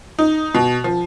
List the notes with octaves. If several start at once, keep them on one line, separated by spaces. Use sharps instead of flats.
D#4
B2
F3